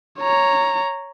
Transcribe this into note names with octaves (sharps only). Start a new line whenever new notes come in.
C#5 A#5